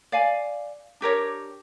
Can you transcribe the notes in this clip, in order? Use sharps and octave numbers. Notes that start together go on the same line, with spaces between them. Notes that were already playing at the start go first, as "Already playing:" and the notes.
D5 F5 G#5
D4 G4 A#4 C#5